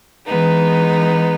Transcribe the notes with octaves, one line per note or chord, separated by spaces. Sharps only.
E3 G#3 B3 D#4